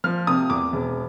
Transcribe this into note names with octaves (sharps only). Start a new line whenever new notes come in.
F3 F6
C3 D#6
E2 D6
E1